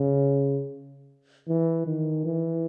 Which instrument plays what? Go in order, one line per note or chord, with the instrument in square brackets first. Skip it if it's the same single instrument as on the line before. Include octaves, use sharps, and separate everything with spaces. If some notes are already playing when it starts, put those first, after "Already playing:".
Already playing: [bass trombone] C#3
E3
D#3
E3